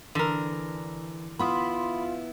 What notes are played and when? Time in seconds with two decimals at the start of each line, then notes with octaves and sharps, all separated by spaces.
0.15 D3 E3 A#4
1.39 B3 E4 F4 B5 C6 D#6